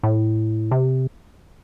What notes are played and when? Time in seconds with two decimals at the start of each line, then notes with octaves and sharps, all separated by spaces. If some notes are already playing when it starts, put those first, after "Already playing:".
0.03 A2
0.71 C3